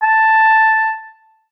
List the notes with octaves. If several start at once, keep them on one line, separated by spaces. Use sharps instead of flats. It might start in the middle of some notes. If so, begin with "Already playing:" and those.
A5